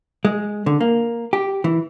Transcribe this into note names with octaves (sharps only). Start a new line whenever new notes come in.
G#3
D3
A#3
G4
E3